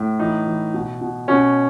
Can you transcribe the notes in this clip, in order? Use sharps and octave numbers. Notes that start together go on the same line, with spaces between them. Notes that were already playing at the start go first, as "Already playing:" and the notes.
Already playing: A2
E3 D#4
E3
B2
B2
B2 C#4